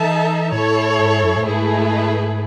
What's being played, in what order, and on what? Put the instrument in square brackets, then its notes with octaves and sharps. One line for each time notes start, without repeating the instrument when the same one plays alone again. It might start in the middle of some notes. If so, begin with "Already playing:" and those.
Already playing: [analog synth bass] E3 [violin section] D#4 A4 E5 A5
[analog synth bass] A2 [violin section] E4 A4 C#5
[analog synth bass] G#2
F#2
A2
[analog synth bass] G#2 [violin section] A3 E4 G#4 B4